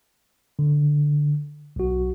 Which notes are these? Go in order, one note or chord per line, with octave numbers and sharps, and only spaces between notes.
D3
B1 F#4